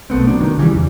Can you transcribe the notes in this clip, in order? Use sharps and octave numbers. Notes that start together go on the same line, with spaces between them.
B1 A3 B3 C4
F#3 G3 D4
D#3
C#3 E3 F#3 G3
E2